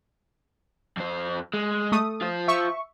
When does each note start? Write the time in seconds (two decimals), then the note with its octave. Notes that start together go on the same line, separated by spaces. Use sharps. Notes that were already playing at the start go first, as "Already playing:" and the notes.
0.97 F2 C5
1.54 G#3
1.92 A3 D#6
2.21 F4 C5
2.48 E5 C#6